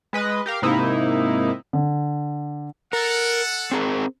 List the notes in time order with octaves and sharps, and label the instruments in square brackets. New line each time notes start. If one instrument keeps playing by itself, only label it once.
[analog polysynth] G#3 B4 D#5
G4 A#4 F5
G#2 C3 A#3 D#4 E4
[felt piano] D3
[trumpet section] A4 F#5 [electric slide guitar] A#4
[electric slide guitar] C4 G#4 A#4